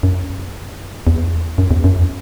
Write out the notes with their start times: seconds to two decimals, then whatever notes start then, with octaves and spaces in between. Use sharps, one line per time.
0.03 F#2
1.07 E2
1.58 F#2
1.71 E2
1.84 F#2